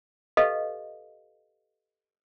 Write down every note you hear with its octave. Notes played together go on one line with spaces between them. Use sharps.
G4 A4 B4 D#5 F5